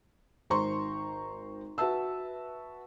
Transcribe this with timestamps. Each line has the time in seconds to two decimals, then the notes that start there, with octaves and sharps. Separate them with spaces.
0.50 G#1 C5 A#5 C6 C#6
1.78 F#4 B4 E5 A5 E6